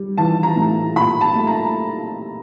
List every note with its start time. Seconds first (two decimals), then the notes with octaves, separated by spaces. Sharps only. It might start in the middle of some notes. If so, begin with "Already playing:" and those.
Already playing: G3
0.18 E3 A5
0.43 A#5
0.56 A2
0.95 A#2 B5
1.21 A5
1.35 A3
1.47 A#5